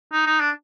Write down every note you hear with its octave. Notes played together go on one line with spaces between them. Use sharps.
D#4
D#4
D4